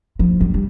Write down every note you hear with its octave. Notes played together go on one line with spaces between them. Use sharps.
F3
G3
G3